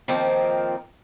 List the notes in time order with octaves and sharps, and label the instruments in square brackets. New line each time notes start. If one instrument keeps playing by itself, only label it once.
[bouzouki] D#3 F3 A#3 C4